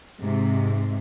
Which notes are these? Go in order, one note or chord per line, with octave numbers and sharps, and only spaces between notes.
G#2 C3